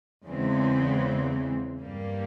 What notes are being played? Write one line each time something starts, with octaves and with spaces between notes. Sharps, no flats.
E2 C#3 E3 G#3 C4
G2 G3 A#3